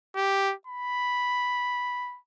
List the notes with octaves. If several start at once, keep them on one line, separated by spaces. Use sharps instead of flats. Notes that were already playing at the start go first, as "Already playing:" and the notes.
G4
B5